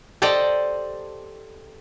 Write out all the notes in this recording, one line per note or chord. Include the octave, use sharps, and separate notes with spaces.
G4 A4 C5 D5 D#5 G5